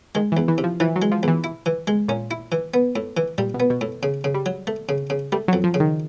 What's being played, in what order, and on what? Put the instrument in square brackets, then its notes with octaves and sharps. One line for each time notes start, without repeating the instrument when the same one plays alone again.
[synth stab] D#3 [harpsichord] G#3
[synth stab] E3
[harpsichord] E2
[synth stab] E3
[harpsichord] C3
[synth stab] F3
[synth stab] E3 [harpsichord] F3
[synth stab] F#3
[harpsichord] G#3
[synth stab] F3
[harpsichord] E2 [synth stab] E3
[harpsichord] E4
E3
G#3
[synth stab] A#2 [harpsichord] C#4
[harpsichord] E4
E3
B3
A2
E3
[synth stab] A#2 [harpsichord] G3
[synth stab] B2
[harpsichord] B3
[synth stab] B2
[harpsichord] A2
C#3
C#3
[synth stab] G3
[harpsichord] F#3
A3
C#3
C#3
[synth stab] G3 [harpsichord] A3
[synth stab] F#3
[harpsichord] F2
[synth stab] F3
[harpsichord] C#3
[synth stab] D#3